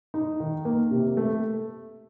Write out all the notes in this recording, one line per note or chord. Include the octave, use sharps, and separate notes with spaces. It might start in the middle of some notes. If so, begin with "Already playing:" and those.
D#4
D#3
A#3
C3
A3